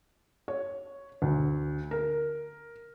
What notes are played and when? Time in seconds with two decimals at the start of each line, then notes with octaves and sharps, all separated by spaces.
0.48 C#5
1.22 D2
1.91 A#4